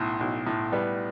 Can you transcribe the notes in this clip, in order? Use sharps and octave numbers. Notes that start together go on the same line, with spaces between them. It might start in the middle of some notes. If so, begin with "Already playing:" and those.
Already playing: B1 A2
B1
A2
G3 B3